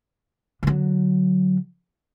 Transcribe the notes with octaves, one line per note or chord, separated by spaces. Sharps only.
D3 F#3